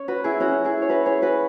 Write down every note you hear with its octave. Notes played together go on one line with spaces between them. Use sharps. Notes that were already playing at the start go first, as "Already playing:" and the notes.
Already playing: C#4 C#5
F#4 B4
E4 G#4
C#4 F#4
E4 G#4
C#5
F#4 B4
G#4 C#5
F#4 B4